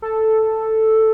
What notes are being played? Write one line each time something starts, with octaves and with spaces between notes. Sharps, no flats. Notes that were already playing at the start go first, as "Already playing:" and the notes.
A4